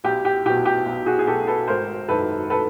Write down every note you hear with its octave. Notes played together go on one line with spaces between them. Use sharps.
B1 G4
G4
B2 F#3 G4
G4
B1
F#4 G#4
G#4
B2 F#3 G4 A4
A4 B4
G#1 A#4 C5
F#2 D#3 A4 B4
A4 B4